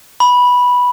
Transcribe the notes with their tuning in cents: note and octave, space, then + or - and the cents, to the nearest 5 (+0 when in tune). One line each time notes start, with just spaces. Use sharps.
B5 -5